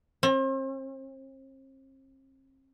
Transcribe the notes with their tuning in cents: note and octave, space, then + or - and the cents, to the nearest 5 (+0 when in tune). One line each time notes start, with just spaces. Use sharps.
C4 +40